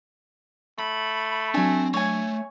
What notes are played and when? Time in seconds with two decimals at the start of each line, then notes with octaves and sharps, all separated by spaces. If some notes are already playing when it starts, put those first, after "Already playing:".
0.79 A3 B5
1.54 F#3 C4 D4 G#5
1.94 A3 C#5 G#5